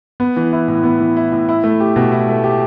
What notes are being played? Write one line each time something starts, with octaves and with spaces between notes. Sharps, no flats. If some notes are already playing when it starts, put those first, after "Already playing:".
B3
E3
E4
A2
B3
E3
E4
A2
E4
A3
G4
B2
E4
A3
G4